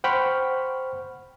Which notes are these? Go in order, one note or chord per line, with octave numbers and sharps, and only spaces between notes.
C5 F#5 G5 B5 C#6 F6